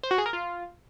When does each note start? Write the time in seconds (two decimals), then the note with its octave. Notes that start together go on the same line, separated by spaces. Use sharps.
0.03 C5
0.11 F#4
0.18 G#4
0.26 A#4
0.33 F4